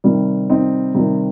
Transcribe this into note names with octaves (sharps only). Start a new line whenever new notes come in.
C3 D#3 G3
C4 D#4
C3 D#3 G3